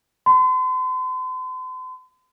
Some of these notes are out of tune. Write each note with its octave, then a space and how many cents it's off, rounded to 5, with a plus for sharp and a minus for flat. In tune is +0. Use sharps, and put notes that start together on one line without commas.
C6 -45